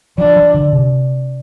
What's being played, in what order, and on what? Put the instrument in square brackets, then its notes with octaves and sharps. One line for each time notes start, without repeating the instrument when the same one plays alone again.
[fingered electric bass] F3 [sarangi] D4
[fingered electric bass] F3
D3
C3